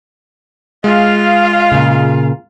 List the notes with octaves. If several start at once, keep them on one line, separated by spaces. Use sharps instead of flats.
G#3 F4 F5
A#2 C#3